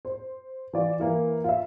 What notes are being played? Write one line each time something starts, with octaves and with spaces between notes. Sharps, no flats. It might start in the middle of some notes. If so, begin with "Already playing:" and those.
C5
E3 F4 D5
E3 A#3 E4
F4 E5